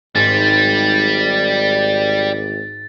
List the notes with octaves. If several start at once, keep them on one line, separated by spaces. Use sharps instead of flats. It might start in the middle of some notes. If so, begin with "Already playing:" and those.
G#1 G#2 G3 A6